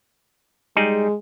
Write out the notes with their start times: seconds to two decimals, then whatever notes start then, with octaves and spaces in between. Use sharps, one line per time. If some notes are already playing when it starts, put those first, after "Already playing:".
0.76 G3 G#3 D#4 G#4